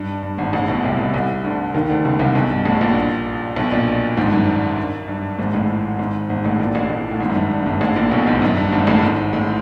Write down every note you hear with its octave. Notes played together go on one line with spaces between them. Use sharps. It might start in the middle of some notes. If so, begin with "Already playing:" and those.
Already playing: G2
G2
G#1 G#2
A1 A2
B1 B2
C2 C3
C2 C3
C2 C3
D2 D3
D#2 D#3
D2 D3
C#2 C#3
C2 C3
B1 B2
G2
A1 A2
A#1 A#2
B1 B2
A#1 A#2
G#1 G#2
G2
F#2
G2
G#1 G#2
A1 A2
G#1 G#2
G#1 G#2
A1 A2
A#1 A#2
A1 A2
A1 A2
A2
G#1 G#2
F#2
G2
G2
G#1 G#2
A1 A2
A#1 A#2
B1 B2
G#1 G#2
F#2
G2
G#1 G#2
A1 A2
G#1 G#2
A1 A2